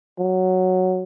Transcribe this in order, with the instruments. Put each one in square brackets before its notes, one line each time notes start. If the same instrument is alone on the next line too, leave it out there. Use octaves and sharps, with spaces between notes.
[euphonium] F#3